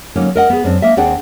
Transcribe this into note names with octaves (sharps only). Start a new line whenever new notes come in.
D3 F#3 A#3 C#4 D#4
A#4 D#5 F#5
B3 G#4
F#2 C4 D4
A#3 D#5 E5
D#2 C4 D4 G#4 F#5 G5